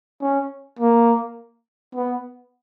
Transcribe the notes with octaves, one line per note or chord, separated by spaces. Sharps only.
C#4
A#3
B3